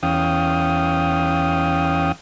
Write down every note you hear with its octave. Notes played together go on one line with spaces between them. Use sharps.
E2 C#4 F5 G5 D#6